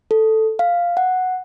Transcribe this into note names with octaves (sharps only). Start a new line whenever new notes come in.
A4
F5
F#5